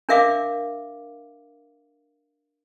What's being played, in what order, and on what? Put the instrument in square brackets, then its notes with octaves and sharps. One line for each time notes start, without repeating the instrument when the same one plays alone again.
[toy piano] D4 A#4 E5 F5 D6